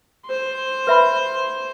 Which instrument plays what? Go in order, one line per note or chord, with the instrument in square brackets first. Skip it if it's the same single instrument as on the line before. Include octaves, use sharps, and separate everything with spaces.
[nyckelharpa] C5 C6
[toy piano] B4 E5 B5